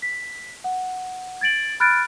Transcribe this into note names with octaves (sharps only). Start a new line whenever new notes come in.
B6
F#5
G#6 A6 D7 F#7
B5 F6 F#6 G#6 A6 D7